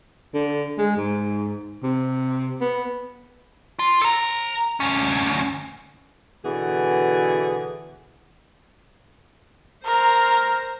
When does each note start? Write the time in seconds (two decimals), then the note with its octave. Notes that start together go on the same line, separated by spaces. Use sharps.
0.34 D3
0.78 G#3
0.97 G#2
1.83 C3
2.60 B3
3.79 F4
4.02 A4 A#5
4.80 D2 C#4
6.45 B2 D3 E3 B3 F#4 G#4
9.85 A#4 C5 A#5